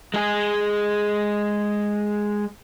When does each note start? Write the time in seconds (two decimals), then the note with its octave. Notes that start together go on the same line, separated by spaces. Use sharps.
0.14 G#3 G#4